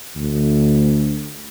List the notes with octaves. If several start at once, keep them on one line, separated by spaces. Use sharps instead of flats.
D2